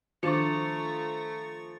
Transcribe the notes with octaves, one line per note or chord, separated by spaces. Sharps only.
D#3 F3 A3 D4 A#5 C#6 A6 C#7